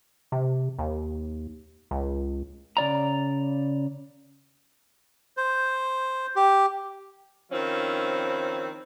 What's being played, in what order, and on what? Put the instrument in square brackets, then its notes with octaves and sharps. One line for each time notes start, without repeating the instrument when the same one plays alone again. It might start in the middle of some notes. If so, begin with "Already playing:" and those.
[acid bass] C3
D#2
C#2
[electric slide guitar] C#3 D5 A#5
[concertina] C5
G4
[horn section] D#3 F3 C4 C#4 E4